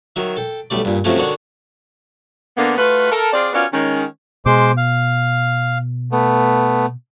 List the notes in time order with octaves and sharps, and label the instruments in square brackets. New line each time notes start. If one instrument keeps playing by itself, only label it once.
[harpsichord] D#3 F#3 E5
A4 G5
B1 G3 A3 D5
G2 A#2
C3 F3 F#3 A3 C#4
D3 D#3 D4 F#4 C#5 C#6
[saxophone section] D3 A#3 B3
A3 F4 F#4 B4
A4 A#4
C4 F4 G#4 D5
B3 C#4 F4 F#4 A#4 D5
D#3 G#3 C#4
[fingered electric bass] B2 [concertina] G#3 C5 D6
[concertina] F5
A3 B3